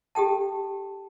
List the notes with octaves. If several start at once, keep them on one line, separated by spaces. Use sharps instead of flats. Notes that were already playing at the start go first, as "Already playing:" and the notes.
G4 A4 G5 A5